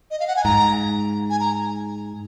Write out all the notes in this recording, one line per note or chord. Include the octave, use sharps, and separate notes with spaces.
D#5
F5
F#5
G#5
G#2 A#5
G#5
A#5